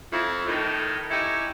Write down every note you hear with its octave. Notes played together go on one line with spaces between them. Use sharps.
F2 E4
A2 D#3
C#4 D#4 E4 G4